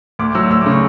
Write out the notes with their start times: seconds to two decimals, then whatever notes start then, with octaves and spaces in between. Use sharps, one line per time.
0.19 D2 D6
0.35 F#3 E6
0.50 D2 E6
0.61 D6
0.66 C#3
0.71 C#6